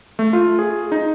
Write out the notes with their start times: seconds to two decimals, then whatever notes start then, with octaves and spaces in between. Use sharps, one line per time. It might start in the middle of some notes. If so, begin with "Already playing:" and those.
0.19 A3
0.33 F4
0.59 G#4
0.92 D#4